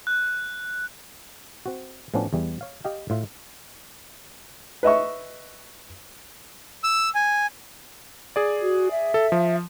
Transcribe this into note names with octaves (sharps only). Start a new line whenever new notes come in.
F#6
C4 F#4
A2 F3 B3 C#4 D4
E2 E3 G3
C#5 F5
G4 D#5 F5 G5
A2 F4 E5
B4 D#5 E5 C#6
E6
G#5
G#4 D5
F#4
E5
A4
F3